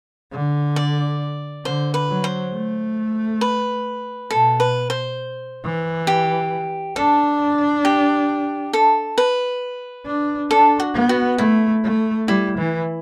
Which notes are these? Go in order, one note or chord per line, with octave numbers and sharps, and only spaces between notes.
D3
D5
D3 C5
B4
F#3
C5
A3
B4
B2 A4
B4
C5
E3
G4
D4 A4
G4
A4
B4
D4
D4 A4
F#4
B3
F#4
A3 E4
A3
G3 E4
E3